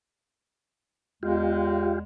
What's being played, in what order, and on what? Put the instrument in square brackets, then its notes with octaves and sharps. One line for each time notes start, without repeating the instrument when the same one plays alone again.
[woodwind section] E2 G#3 [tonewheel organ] F4 G4